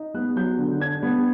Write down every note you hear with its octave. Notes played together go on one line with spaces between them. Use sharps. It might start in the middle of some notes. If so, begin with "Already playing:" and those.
Already playing: D#4
B3 F#6
F#3 G6
D3
D4 G#6
B3